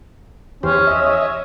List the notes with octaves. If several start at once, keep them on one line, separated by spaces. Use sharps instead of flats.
E2 C#4 G4 C5
D#5 E5
C#5